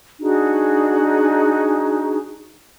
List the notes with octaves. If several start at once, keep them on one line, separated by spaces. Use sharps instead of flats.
D4 D#4 F#4 G#4